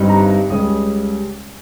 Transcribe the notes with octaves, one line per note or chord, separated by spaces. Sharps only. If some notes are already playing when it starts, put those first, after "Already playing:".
Already playing: G1 G2 G3 C4 D#4
A#5
C#2 C#3 G3 C#4 D#6